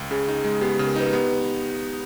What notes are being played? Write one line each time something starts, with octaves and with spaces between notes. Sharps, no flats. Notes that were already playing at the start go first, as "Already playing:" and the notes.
Already playing: C#2
C#3 G#4
D#4
G#3
B3 G4
C#3 G4
A#4
D#4 B4
B3 G4